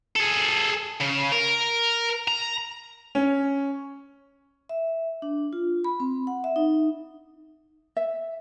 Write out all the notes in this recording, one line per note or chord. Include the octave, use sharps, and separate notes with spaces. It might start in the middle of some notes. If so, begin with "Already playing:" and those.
G#4 A4
C#3
A#4
A#5
C#4
E5
D4
F4
B5
C4
F#5
E5
D#4
E5